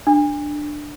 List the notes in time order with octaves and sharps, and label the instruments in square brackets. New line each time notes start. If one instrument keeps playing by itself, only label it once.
[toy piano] D4